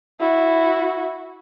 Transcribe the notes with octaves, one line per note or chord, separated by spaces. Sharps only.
E4 F#4